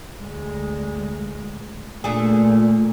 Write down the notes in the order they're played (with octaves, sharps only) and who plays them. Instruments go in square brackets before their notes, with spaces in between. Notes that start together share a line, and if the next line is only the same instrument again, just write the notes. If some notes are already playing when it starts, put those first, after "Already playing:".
[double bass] D2 G#3
[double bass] A#2 [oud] A3 D4 G#4